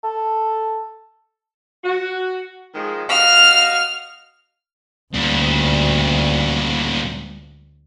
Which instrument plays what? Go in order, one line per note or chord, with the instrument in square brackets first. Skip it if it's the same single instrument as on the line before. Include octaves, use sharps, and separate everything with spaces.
[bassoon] A4
[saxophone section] F#4
D#3 F3 G#3
[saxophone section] F#4 D#5 F5 [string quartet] F6
[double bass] D2 [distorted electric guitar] A#2 G3